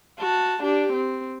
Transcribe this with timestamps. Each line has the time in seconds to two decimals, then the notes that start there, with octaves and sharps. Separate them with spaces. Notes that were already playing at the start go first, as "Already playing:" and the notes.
0.19 F#4 A5
0.63 D4 G4
0.93 C4